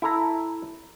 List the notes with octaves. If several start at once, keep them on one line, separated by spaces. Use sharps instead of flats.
E4 A4 A#5